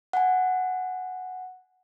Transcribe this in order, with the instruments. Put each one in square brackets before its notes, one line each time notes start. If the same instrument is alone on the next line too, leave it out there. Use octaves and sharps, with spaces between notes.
[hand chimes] F#5 G#5